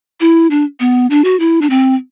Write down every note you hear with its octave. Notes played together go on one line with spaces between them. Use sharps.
E4
D4
B3
D4
F#4
E4
D4
C4